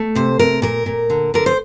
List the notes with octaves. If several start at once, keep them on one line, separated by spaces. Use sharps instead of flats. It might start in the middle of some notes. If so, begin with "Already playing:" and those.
Already playing: A3
C3 C5
C3 A#4
A#2 A#4
A#2
D3
D3 A#4
C5